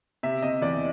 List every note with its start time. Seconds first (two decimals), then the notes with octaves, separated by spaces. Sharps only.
0.23 C3 E5
0.42 C3 D#5
0.61 E2 D5